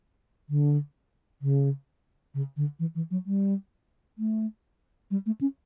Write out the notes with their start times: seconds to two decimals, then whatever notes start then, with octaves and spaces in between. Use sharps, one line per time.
0.49 D3
1.42 C#3
2.34 C#3
2.57 D3
2.79 E3
2.95 E3
3.11 F#3
3.26 G3
4.18 A3
5.11 G3
5.26 A3
5.41 C#4